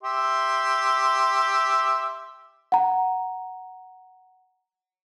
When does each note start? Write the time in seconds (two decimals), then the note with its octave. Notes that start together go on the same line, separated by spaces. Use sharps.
0.03 G4 E5 C6
2.72 F#5 A#5